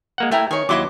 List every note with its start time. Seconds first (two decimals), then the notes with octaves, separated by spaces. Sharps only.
0.18 G#3 A#3 F#5
0.32 A3 E4 G5 G#5 A#5
0.51 D#3 C#5 G#5
0.69 D#2 F#3 E4 D#5 C6 D6